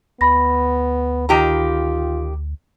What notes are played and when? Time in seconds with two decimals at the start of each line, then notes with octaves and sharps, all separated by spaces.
0.21 D2 B3 B5 A#6
1.29 D#3 F4 G4 A#5